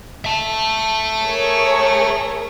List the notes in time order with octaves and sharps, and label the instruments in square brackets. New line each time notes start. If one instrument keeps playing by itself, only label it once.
[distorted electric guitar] E5 A5
[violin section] G#4 A#4 C#5